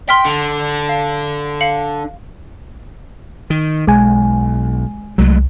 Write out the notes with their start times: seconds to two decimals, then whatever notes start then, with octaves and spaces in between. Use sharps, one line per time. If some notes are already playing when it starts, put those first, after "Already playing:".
0.09 G5 C6 F6 B6
0.25 D3
0.89 F5
1.61 F5 C#7 F#7
3.50 D#3
3.87 B1 G#3 G#5
5.18 C2 F#3 G#3 A3